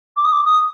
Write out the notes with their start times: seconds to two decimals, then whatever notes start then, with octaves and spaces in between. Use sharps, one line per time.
0.17 D6
0.24 D#6
0.32 D6
0.45 D#6